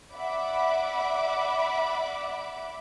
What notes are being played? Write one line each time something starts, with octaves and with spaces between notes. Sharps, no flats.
D5 E5 F#5 B5 D6